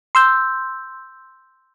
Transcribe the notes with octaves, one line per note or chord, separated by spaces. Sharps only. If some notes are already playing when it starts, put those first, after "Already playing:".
C6 E6 G6